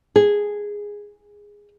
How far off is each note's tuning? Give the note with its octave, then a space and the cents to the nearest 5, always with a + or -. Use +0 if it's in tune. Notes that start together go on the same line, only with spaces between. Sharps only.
G#4 -5